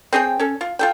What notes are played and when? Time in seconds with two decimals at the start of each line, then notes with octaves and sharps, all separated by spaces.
0.13 C4 G#4 C#5 G5
0.39 C#4 A4
0.61 F4
0.79 F4 A4 G5